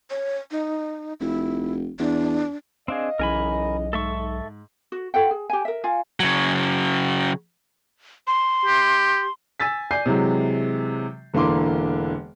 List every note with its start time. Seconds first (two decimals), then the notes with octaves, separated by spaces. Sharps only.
0.10 C#5
0.51 D#4
1.20 F1 E4
1.99 E2 D4
2.88 C4 D4 G#4 D#5 F5
3.19 B1 C#3 E3 A#4 G#5 B5
3.93 G#2 A4 E5 C#6
4.92 F#4
5.14 F4 A4 F#5 G5
5.31 G#4
5.50 G4 G#5
5.65 A#4 E5
5.84 F4 F5 G#5
6.20 C#3 F#3
8.27 C6
8.65 G4
9.60 G#5 E6 A6 B6
9.91 D5 G#5 G6 C7
10.06 C3 E3 F#3 G#3
11.34 E1 D3 E3 A#3 C6 D6